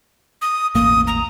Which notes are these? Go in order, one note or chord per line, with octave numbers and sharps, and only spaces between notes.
D#6
E1 A1 A#3 D#6
A#5